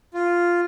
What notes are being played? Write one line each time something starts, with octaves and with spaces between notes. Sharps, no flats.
F4